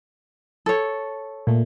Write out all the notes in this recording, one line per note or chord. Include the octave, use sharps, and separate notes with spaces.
A4 C#5
A#2 A3